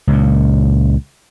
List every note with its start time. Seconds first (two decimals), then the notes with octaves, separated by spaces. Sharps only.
0.07 C#2 A#2